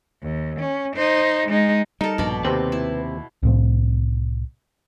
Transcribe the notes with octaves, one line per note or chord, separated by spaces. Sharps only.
D#2
C#4
D#4 C5
G#3 D#4
G3 D#4 A4 A#4
A#1 G2 B2 D5 B5
D#2 C3 C4 B4
E4
C2 A2 C4